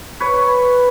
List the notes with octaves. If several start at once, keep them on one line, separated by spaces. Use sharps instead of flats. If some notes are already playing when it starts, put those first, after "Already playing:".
B4 C#5